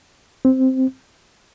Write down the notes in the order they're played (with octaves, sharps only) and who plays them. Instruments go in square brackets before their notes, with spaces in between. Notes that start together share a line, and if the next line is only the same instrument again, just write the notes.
[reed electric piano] C4